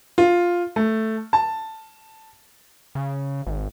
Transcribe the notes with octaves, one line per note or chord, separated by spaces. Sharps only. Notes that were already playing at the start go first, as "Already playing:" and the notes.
F4
A3
A5
C#3
G#1